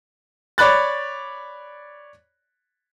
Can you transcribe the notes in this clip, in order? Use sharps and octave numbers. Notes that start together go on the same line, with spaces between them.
C#5 D5 B5 F#6 A6